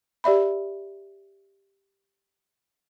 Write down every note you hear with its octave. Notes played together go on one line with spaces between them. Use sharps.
G4 D5 E5 B5